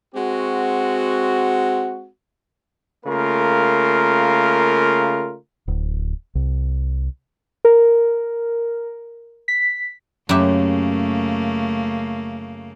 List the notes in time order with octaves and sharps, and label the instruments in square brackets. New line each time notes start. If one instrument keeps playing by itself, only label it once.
[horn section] G#3 C4 F#4
[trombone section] C#3 A3 A#3 F4 A#4
[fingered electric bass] D1
C2
[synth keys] A#4
B6
[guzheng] F#2 G4 E5 [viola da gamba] C#3 A3 A#3